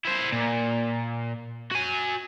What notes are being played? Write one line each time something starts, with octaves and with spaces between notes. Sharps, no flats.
E4 C5
A#2
F#4 G#5